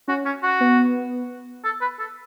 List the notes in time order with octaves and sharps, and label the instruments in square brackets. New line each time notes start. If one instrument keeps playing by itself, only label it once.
[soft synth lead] C#4 [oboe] F#4
[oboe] C#4
F#4
[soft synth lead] B3
[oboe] A4
B4
A4